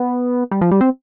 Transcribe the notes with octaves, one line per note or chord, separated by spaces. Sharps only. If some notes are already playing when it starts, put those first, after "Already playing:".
Already playing: B3
G3
F3
G3
C4